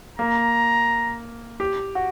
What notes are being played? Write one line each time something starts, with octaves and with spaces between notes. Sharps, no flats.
A#3 A#5
G4
F#4